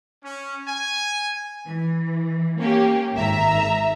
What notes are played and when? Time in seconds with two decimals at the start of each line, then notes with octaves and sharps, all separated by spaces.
0.24 C#4
0.67 G#5
1.66 E3
2.59 A#3 C#4 G4
3.14 G#1 D#3 E5 A#5